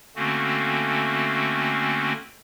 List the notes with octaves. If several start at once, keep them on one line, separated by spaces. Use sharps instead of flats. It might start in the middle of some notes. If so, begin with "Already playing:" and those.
D3 A3 A#3 C4 C#4 F#4